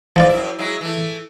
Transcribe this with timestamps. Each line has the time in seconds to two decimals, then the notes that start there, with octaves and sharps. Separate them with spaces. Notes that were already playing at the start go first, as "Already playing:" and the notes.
0.16 G#2 F3 F4 B4 D5
0.29 F#2 E4
0.59 F#3 G#3 E4
0.81 E3 A3